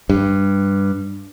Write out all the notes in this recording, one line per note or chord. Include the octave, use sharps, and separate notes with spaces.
G2